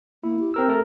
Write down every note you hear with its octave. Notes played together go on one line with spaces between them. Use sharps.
A#3 E4
G4
C4 A#4 E6
A3 A4 A#4